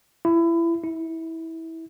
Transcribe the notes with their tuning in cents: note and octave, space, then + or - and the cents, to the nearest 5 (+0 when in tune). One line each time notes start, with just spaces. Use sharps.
E4 +25
E4 -20